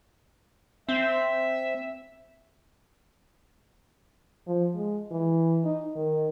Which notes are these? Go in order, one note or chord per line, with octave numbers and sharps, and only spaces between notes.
C4 E5
F3
G#3
E3
D#4
D#3